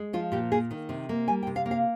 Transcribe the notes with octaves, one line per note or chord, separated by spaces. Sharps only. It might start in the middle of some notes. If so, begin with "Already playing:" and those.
Already playing: G#3
F3 F4
A#2 G4
A#3 G#4
D#3
C3
A#3
G3 G#5
G5
C3
F5
A#3
F5